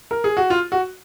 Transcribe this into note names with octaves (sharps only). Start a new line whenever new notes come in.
A#4
G#4
F#4
F4
F#4